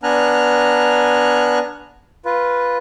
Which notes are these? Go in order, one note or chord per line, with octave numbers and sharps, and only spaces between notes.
B3 D4 G#5 A#5 F6 F#6
F4 B4